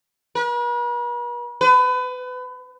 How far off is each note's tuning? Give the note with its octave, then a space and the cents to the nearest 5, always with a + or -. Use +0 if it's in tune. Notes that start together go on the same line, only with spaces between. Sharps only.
B4 -45
B4 +30